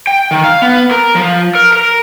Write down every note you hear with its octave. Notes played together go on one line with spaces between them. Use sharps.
G5
D#3
F5
B3
A#4
F3
A#4
A#4